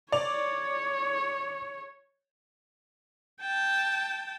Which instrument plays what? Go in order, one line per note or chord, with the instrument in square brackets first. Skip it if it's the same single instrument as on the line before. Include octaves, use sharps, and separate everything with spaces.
[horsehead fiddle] C#5 [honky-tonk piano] D5 F7
[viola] G5 A5